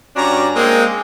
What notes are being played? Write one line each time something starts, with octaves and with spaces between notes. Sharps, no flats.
G2 C#4 D4 F#4 D5 A#5
G#3 A#3 C4